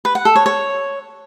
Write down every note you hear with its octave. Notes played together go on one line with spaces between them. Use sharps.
B4
F#5
A4
C#5
C#5